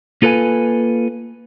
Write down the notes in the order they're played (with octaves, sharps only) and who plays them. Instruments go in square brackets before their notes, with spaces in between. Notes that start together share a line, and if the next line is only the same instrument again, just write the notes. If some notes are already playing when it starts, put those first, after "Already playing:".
[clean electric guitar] A#3 F4 A4 B4 F5 G#5